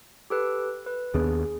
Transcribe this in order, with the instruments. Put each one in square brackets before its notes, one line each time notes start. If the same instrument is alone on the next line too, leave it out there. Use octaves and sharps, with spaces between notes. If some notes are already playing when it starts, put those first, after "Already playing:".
[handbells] G4 A4 B4
B4
[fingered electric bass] D#2 B3 D4 [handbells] G#4